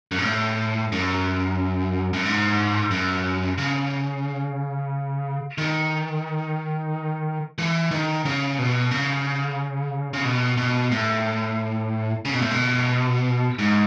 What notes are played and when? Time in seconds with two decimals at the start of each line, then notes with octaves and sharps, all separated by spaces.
0.12 F#2
0.19 G#2
0.25 A2
0.92 F#2
2.13 F#2
2.25 G#2
2.91 F#2
3.58 C#3
5.58 D#3
7.58 E3
7.91 D#3
8.25 C#3
8.59 B2
8.91 C#3
10.13 C#3
10.25 B2
10.58 B2
10.92 A2
12.25 C#3
12.33 B2
12.42 A2
12.51 B2
13.59 G#2